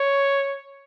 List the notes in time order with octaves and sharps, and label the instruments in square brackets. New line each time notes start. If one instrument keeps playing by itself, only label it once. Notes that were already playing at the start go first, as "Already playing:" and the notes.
Already playing: [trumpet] C#5